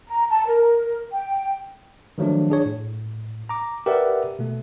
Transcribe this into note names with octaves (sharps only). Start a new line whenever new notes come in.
A#5
A5
A#4
G5
D#3 F3 F#3 A3 D4
D4 G#4 C#5
A2
A#5 D6
G4 A#4 B4 D5 E5 F#5
B2 A3